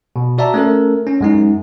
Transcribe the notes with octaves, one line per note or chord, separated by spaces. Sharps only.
B2
F#4 D5 E5 A5 A#5
A3 C#4 A4 A#4
C#4
F#2 G#3 D#4